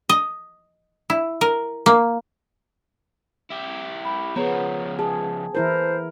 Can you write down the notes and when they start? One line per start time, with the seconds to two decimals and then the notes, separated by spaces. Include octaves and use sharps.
0.09 D#5
1.10 E4
1.41 A#4
1.86 A#3
3.50 E4 G4
4.05 B5
4.36 C#3 F3 B3 G#4 C#5 A#5
4.99 G#4 A5
5.55 E3 E4 A#4 C5